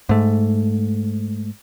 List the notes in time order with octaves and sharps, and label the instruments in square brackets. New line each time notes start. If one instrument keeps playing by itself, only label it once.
[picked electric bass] G#2 A3